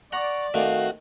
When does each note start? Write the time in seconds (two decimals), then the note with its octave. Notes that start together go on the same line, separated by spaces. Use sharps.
0.12 D5 F#5 A#5 C#6
0.54 D#3 A3 C4 F#4 F5